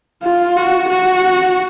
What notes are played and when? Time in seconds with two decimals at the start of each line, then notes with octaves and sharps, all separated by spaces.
0.23 F4
0.57 F#4
0.89 F#4